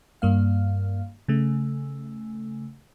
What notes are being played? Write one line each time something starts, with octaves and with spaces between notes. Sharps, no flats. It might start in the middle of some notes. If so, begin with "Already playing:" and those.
G2 A#3 F5
C#3 A3